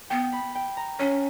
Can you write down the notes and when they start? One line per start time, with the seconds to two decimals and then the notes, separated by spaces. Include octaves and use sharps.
0.10 B3 G5
0.32 B5
0.55 G5
0.77 A#5
0.99 C#4 C#5